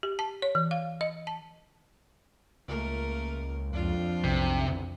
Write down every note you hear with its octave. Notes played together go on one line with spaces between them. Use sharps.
G4
A5
C#5
E3
F5
D#5
A5
C#2 A3 A#3 A#4
F2 D4 F4
B1 C3
E2